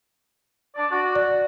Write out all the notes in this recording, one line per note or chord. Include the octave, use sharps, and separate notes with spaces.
D4 D5
F#4
D5